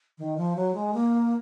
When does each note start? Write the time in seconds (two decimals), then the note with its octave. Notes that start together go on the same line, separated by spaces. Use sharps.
0.18 D#3
0.38 F3
0.56 F#3
0.74 G#3
0.94 A#3